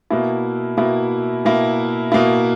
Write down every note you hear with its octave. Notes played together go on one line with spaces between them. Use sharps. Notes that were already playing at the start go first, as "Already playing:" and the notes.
B2 A#3 E4
B2 A#3 E4
B2 A#3 E4
B2 A#3 E4